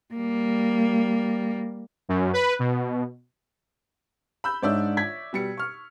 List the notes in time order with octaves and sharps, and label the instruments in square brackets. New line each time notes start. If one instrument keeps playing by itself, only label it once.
[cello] G3 A#3
[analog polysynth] F#2
B4
B2
[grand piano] B5 E6 G6
[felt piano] G#2 D4 E6 [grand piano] C#5 D5 E5
[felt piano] G#6 B6
[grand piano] B2 G3 C#7
C#6 F6